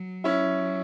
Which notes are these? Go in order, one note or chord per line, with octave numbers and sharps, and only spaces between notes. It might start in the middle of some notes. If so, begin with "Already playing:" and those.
Already playing: F#3
C#4 E4